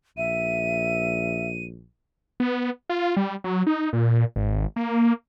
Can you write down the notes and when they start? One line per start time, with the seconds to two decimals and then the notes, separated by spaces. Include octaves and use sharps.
0.17 A#1 E5 D#7
2.40 B3
2.89 F4
3.17 G3
3.44 F#3
3.67 D#4
3.93 A#2
4.36 G#1
4.76 A#3